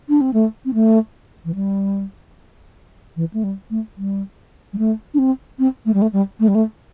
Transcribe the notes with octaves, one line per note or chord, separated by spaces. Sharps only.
D4
C4
A3
C4
A3
E3
G3
E3
A3
G3
A3
G3
G3
A3
D4
C4
C4
A3
G3
A3
G3
A3
G3
A3